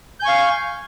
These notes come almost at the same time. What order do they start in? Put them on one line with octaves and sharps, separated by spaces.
G6 G#5 C#6 F5